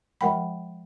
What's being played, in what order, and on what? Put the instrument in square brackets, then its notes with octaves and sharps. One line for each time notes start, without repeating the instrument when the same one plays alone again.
[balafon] F3 G#3 A#4 F#5 G5 B5